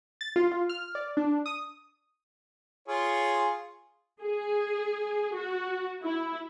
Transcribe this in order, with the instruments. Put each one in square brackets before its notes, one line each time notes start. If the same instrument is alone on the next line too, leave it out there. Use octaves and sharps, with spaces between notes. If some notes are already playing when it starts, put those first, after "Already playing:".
[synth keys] A6
F4
F4
F6
D5
D4
D#6
[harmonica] F4 G#4 C#5
[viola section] G#4
F#4
E4